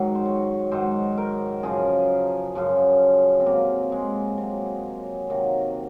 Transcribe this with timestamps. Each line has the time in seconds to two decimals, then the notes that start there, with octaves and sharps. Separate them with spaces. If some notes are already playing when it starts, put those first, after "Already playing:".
Already playing: G#2 D#3 F#3
0.15 C5
0.26 C#5
0.71 G#2 D#3 F#3 C5
1.18 A#4
1.63 F#2 C#3 F3 G#4
2.55 F#2 C#3 F3
3.40 C4
3.46 C3 F#3 A#3
3.92 G#3
4.38 C3 F#3
5.29 C3 D#3 F#3 A#3